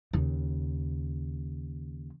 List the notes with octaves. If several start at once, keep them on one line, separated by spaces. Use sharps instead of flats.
D#2 C#3